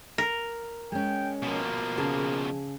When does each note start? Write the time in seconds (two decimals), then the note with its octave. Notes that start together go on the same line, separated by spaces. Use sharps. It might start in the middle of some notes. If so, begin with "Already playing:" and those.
0.18 A#4
0.92 G#3 C#4 G5
1.43 B2 F3 A#3
1.97 C#3 G#4 A5